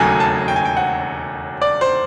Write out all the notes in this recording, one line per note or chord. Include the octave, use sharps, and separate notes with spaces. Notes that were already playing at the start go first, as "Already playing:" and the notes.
Already playing: E1 D#2 C#3 F#3 A3 G#5
A5
G5
G#5
G5
F#5
D5
C5